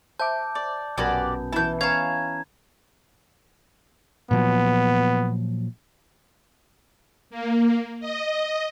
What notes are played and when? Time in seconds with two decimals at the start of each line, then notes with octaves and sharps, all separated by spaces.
0.19 C5 E5 A5 D6 G6
0.55 D5
0.98 A#1 F#2 B2 F#4 G4 D5 G#5
1.52 E3 E4 A5 G6
1.81 C#4 C#5 F5 A#5 G#6
4.31 A#2 F3 F#3 B3
7.30 A#3
8.00 D#5